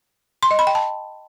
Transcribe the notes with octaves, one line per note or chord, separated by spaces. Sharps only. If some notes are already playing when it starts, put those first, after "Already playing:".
C6
D#5
B5
G5
A5